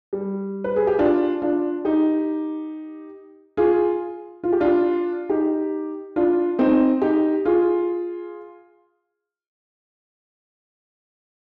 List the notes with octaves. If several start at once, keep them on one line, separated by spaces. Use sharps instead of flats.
G3
B4
G#4
G4
D4 F4
D4 F4
D#4 G4
F4 G#4
F4
G4
D4 F4
D#4 G4
D4 F4
C4 D#4
D#4 G4
F4 G#4